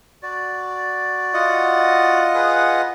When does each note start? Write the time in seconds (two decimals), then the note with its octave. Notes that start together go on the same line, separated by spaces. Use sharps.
0.23 F#4 D5
1.34 F4 D#5 F#5
2.34 G#4 B4 D#6